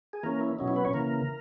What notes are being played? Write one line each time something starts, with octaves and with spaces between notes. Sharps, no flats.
G#4
E3 A#3 C#4 A#4
E4
B2 F#3 C#4 D#4
E4
B3 B4
C#4 C#5
C#3 E3 A#3 A#4